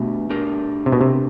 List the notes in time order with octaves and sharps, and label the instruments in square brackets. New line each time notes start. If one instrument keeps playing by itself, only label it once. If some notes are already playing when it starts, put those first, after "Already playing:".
Already playing: [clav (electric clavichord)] B2 [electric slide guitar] A3 D4 G4 B4 E5
[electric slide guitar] A3 D4 G4 A#4
[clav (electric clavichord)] C3
B2
C3